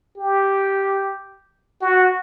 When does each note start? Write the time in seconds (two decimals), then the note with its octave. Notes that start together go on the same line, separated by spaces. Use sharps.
0.17 G4
1.81 F#4